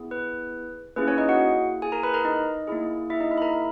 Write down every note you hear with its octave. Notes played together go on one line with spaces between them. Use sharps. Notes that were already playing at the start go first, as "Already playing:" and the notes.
Already playing: B3 E4 G#4
B4
A#3 C#4 E4 G#4 B4
C#4 C#5
D#4 D#5
F#4 F#5
G#4 G#5
A#4 A#5
B4 B5
A#4 A#5
D#4 D#5
A#3 E4 G#4
E4 E5
D#4 D#5
E4 E5
B5
A#4 A#5